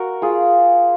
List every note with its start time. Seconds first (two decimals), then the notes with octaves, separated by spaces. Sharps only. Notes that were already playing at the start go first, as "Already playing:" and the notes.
Already playing: F#4 A#4
0.22 F4 G#4